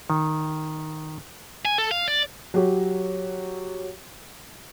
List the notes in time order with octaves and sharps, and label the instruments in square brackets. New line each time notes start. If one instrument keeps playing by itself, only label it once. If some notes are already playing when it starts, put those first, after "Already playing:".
[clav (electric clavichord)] D#3
[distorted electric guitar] G#5
A4
F5
D5
[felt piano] F#3 G4